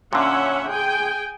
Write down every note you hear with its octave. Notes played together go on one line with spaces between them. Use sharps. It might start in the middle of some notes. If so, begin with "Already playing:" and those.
A#2 D3 C#4 E5 F#5
G#4 G5 G#5